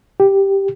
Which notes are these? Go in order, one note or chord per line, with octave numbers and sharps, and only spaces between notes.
G4